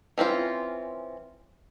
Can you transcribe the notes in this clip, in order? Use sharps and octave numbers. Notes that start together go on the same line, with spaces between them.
E3 C4 C#4 F4